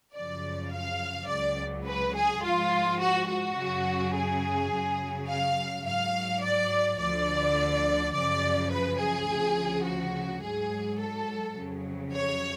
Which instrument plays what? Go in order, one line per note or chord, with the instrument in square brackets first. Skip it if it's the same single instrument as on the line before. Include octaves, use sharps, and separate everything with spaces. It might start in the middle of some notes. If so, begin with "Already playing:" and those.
[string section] F#2 C#3 F3 D5
F5
C#2 C#3 F#3 D5
B4
G#4
G#2 F3 F4
F#4
F#4
F#2 C#3 F#3
G#4
F#2 C#3 F#3
F5
G#2 F#3 F5
D5
D2 D3 F3 D5
F#2 C#3 F3 D5
B4
G#4
D2 C#3 F3
F#4
G#2 F#3 G#4
A4
F2 C#3 F#3
C#5